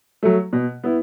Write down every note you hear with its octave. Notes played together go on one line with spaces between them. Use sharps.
F#3 A3
B2
B3 E4